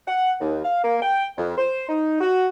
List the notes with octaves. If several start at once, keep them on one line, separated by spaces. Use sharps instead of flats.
F#5
D#2
F5
A#3
G5
F2
C5
D#4
F#4